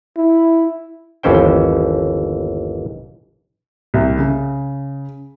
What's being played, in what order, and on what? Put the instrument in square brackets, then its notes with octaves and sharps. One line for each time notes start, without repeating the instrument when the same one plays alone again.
[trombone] E4
[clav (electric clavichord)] G1 D#2 E3 C#4 C5 G5
[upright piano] C2
C#3